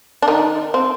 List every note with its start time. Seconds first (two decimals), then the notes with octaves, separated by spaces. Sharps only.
0.22 D4
0.28 D#3 D#4
0.74 C4